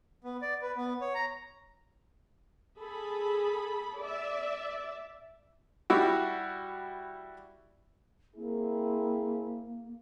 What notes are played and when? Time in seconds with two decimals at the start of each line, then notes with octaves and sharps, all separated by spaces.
0.24 B3
0.42 D5
0.62 B4
0.76 B3
1.01 C#5
1.15 A#5
2.81 G#4 A4 B5
4.01 D5 E5
5.90 G3 E4 F#4
8.36 A#3 C4 E4 G#4